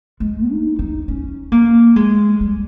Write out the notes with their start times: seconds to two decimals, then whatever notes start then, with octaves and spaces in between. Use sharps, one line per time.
0.20 G#3
0.50 D#4
0.79 D#4
1.08 C#4
1.52 A#3
1.96 G#3
2.40 G3